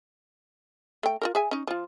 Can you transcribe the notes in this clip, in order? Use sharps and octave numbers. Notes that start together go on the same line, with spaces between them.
A3 G5
F4 F#4 A#4
G#4 E5 G#5
C#4 D#4
F3 F4